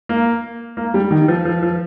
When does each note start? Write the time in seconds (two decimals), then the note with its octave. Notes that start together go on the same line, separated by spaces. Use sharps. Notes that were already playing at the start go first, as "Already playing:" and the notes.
0.09 A#3
0.77 A#3
0.94 G3
1.11 D#3
1.28 F3
1.45 F3
1.62 F3